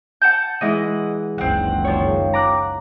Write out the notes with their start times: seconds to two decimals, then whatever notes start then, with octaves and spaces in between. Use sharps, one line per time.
0.22 F#5 A5 G6
0.61 E3 G#3 E4 D#5 F#5
1.38 F#1 C#2 D#3 C4 F#5
1.84 F3 C#5
2.33 A#5 D6 F#6